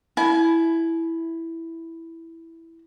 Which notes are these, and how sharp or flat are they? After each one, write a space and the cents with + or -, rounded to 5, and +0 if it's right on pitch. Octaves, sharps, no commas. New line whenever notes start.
E4 +0 G#5 +40